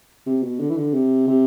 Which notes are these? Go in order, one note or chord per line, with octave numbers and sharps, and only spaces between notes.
C3
B2
D3
E3
D3
C3
C3